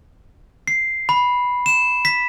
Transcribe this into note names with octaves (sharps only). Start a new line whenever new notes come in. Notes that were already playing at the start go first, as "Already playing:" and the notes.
C7
B5
E7
B6